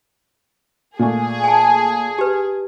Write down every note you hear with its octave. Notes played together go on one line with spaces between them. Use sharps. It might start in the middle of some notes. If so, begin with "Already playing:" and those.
A#2 A3 G#4
G#5 A5
G4 B4